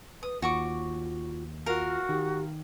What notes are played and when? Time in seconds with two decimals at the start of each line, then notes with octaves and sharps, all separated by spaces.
0.23 B4 D#6
0.42 D#2 F4 F#4 C#6 D6
1.66 F4 F#4 A#4 F5
2.09 D#3 G4